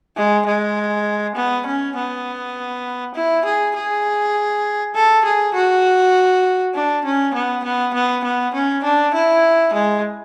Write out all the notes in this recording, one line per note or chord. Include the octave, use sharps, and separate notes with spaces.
G#3
G#3
B3
C#4
B3
E4
G#4
G#4
A4
G#4
F#4
D4
C#4
B3
B3
B3
B3
C#4
D4
E4
G#3